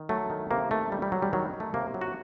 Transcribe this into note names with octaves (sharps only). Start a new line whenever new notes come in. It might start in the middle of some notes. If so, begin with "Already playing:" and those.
Already playing: D#3
F#3 A3
D#3
C3 A#3
D#3 A3
D#3 G3
G3
F#3
G3
D#3 F#3
D#3
A3
C3 A#3
F#3
F#4